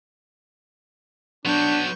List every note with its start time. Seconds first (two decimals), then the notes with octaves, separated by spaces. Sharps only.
1.45 F#3 B3 D4 C#6 G6